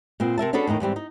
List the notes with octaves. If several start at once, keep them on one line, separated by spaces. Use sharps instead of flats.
A#2 B3 C4
C3 A#4 E5 A5
C#4 D4 F#4 G#4 A4 B4
E2 A2 D#3 D#4
G#2 E3 G3 C4
D#4